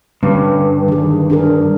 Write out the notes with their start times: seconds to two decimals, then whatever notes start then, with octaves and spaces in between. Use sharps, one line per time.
0.23 G2 D3 C#4
0.88 D#3 G#4
1.30 D4 G#4 A#4